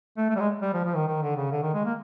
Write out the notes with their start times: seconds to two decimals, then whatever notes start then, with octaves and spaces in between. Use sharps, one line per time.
0.17 A3
0.30 A3
0.36 G3
0.40 G#3
0.62 G3
0.74 F3
0.85 F3
0.96 D#3
1.08 D#3
1.22 D3
1.37 C#3
1.52 D3
1.62 D#3
1.74 G#3
1.85 A#3